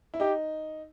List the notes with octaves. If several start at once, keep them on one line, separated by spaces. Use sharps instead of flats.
E4
D#4 G4